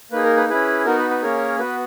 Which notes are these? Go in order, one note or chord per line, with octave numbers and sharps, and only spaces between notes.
A#3 D#4 G#4 B4
A#4
B4
C#4 E4 G#4 B4
B3 D#4 F#4 A#4
B4
B4
A#3 C#4 G#4 A#4 C#5
B3 F#4 B4